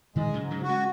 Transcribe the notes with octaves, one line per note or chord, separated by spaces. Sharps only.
A#2 D#3 G#3
C#3 F#3
G#2
C#3 F#3
F#4
G#3 C#4